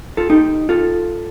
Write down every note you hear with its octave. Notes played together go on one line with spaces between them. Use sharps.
F4 A4
D#4 G4
F4 A4